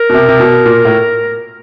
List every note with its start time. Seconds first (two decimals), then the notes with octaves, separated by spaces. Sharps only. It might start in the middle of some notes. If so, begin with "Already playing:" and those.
Already playing: A#4
0.10 B2
0.14 C3
0.29 C3
0.40 B2
0.66 A#2
0.85 A2